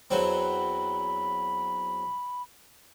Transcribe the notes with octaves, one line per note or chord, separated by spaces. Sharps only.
E2 F#3 C4 B5